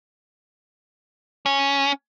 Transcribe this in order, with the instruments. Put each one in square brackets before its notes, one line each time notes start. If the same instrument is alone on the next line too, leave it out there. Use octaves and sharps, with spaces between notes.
[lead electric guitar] C#4